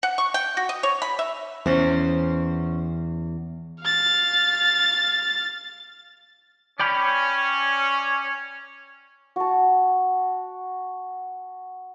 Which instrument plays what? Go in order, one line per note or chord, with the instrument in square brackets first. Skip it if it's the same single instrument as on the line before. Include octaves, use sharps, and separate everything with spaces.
[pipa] F#5
C#6
G5
F#4
D#5
C#5
B5
E5
[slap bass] E2 [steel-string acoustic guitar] C#4 C5
[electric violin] F5 A6
[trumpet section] C#4 [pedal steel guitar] D5 G5 B5
[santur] F#4 A5